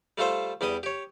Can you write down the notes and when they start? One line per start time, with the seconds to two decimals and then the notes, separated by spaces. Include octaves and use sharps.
0.18 G3 A3 F4 A4 C5
0.61 E2 G3 G4 G5 D#6
0.83 G4 C#5